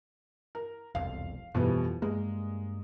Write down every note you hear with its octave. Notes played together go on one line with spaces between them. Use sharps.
A#4
E1 C2 F2 F5
F2 B2 E3 F3 G3
G2 G#3 A#3